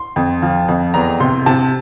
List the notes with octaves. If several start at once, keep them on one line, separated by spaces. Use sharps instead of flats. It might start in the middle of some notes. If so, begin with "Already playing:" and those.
Already playing: C6
F2
F3
F2
E2 A#5
C3 C6
C3 A5